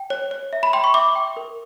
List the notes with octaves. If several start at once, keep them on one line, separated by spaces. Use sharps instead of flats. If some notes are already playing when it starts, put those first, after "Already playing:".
Already playing: G5
C#5
C#5
E5
B5
G5 C6
C#6
E5 D6
G5
A#4